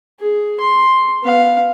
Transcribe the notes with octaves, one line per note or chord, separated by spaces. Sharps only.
G#4
C6
B3 F5